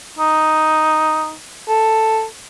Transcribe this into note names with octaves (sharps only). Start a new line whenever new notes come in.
D#4
A4